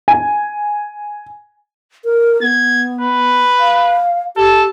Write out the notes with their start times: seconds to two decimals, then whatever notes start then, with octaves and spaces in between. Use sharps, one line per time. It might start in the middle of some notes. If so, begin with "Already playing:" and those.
0.08 G#5
2.05 A#4
2.42 B3 G#6
3.01 B4
3.60 F5
4.37 G4 A4